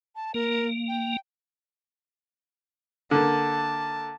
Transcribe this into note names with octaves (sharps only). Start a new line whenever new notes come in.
A5
A#3 A#4
G5
D3 A#3 A5